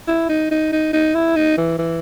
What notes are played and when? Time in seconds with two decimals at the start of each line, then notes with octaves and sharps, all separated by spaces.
0.08 E4
0.29 D#4
0.51 D#4
0.72 D#4
0.93 D#4
1.15 E4
1.36 D#4
1.57 E3
1.79 E3